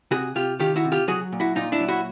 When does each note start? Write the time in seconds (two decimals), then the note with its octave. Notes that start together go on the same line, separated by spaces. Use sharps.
0.11 C3 F#4 G#4
0.35 C3 F4 G4
0.60 D#3 F4 G4
0.76 E4 F#4
0.85 C3
0.92 F4 G4
1.08 F#3 F#4 G#4
1.32 A#2
1.40 E4 F#4
1.56 A#2 D#4 F4
1.72 D4 E4
1.80 F#3
1.89 E4 F#4